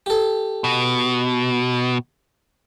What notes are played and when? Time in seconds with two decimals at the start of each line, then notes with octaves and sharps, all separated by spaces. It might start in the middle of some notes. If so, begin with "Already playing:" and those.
0.06 G4 A4
0.64 B2